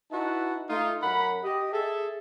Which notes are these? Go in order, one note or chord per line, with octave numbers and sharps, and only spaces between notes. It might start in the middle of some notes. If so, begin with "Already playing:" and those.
D#4 E4 F#4 B4 E5 A5
A3 D#4 F4
F#2 A#4 F#5 B5
G4 D#5
G#4 A4 E5